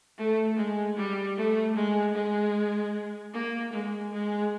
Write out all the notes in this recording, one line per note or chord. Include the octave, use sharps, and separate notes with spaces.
A3
G#3
G3
A3
G#3
G#3
A#3
G#3
G#3